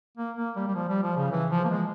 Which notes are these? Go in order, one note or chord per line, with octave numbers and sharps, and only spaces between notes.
A#3
A#3
G3
G3
F3
G3
F3
C#3
E3
F3
A#3
G#3